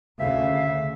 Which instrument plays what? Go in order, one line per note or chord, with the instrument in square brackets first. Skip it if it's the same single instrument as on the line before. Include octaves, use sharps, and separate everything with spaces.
[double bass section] D2 C#3 [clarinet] E5 [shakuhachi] F5